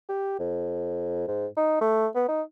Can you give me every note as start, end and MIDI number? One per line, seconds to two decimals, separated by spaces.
0.09 0.39 67
0.39 1.27 41
1.28 1.46 44
1.57 1.79 63
1.81 2.07 57
2.15 2.24 59
2.28 2.42 63